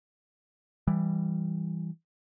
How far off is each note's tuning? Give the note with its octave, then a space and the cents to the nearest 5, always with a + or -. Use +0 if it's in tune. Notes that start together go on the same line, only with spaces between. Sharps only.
E3 +0 G3 +0